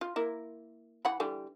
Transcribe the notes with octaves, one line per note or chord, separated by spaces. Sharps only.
F4
A#3 E4 A#4
E3 F#5 B5
D3 E3 G3